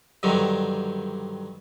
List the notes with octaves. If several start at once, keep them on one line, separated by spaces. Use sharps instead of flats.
G2 D3 D#3 F#3 C4